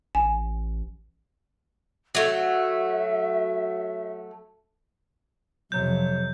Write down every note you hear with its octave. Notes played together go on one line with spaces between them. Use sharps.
A1 G#5
F#3 A3 E5
F2 C3 F#3 G6